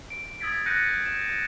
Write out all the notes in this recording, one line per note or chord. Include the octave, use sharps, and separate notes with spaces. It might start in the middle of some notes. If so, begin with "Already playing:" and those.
D7
D#6 E6 G#6 A6 B6 D7
F#6 G6 A6 A#6 C#7 D#7
E7